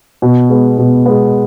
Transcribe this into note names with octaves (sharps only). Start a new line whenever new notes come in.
B2
G#3 B3
B2
G#3 B3